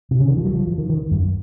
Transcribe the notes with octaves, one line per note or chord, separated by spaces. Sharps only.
C3
C#3
D#3
F3
F#3
F3
F3
D#3
D#3
F#2